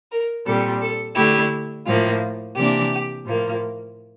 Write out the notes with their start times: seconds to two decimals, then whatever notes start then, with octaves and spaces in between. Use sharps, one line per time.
0.11 A#4
0.45 A#2 G3 C4 A4
0.81 A4
1.16 D3 A3 E4 G4
1.86 A2 F3 A#3 F4
2.56 C3 E3 A#3 D4 G4
3.25 A2 F3 A#3